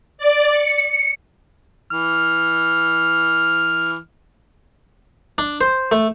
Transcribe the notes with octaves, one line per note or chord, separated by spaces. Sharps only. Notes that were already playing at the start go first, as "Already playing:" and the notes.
D5
C#7
E3 F6
D4
C5
A3